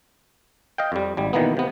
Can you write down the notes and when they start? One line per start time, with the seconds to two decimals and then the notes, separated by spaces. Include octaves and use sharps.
0.78 D#5 F5 G5
0.92 F2 G3
1.17 G#1 G3
1.33 B2 D#3 E3 A#3 B3
1.57 C3 B3